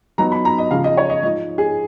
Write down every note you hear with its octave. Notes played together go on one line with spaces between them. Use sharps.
F#3 B3 D#4 A#5
B5
A#5
D#5
C#3 F3 G#3 F5
D#5
C#5
D#5
F3 G#3 D#4 D#5
G#4